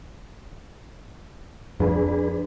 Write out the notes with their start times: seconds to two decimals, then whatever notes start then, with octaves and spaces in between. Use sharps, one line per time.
1.80 F2 D4 G#4 B4